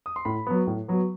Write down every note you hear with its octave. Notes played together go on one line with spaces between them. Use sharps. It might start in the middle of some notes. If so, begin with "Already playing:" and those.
D#6
C6
A2 B5
F#3 B3
A2
F#3 B3